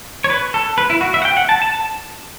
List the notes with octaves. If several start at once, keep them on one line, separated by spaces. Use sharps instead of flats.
C#5
B4
A4
B4
E4
F#4
E5
F#5
G5
F#5
A5
A5